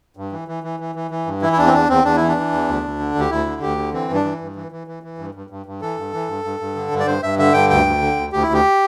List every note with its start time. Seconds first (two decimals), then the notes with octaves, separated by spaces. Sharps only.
0.17 G2
0.32 E3
0.48 E3
0.64 E3
0.80 E3
0.95 E3
1.11 E3
1.26 G2
1.42 E3 E4
1.53 E4
1.58 E2 D4
1.66 C4
1.74 E2 D4
1.89 E2 C4
2.04 E2 D4
2.16 E3 E4
2.28 D4
2.37 E3
2.52 E2
2.68 D2
2.84 D2
2.99 D3
3.15 D2 G4
3.30 D2 E4
3.46 D3
3.62 D2 G4
3.78 D3
3.93 E3 C4
4.09 G2
4.14 D4
4.24 E3
4.40 G2
4.56 E3
4.72 E3
4.87 E3
5.03 E3
5.18 G2
5.35 G2
5.50 G2
5.66 G2
5.82 E3 A4
5.97 G2
6.13 E3
6.28 G2
6.44 G2
6.60 G2
6.76 D3
6.91 G2
7.00 D5
7.07 G2 C5
7.23 G2 E5
7.39 D3 E5
7.54 G2 G5
7.70 D2 G5
7.86 D2
8.01 D3
8.17 D2
8.32 D2 G4
8.43 D2 E4
8.53 G4